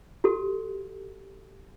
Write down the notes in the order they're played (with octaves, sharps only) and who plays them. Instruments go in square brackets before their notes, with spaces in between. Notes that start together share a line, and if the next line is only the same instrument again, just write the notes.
[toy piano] F#4 G4 A4